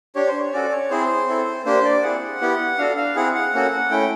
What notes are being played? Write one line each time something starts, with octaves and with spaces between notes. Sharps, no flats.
D4 G4 C#5
C5
C#5
C#4 F#4 A4 D5
C#5
C4 E4 G#4 C5
C4 E4 A4
A#3 D4 G4 C5
D5
C4 E4 G#4 F#5
B3 E4 G4
D4 F#4 A4 F5
F5
C4 E4 G#4 F#5
F#5
A#3 C#4 F#4 A4
A3 C#4 E4 G5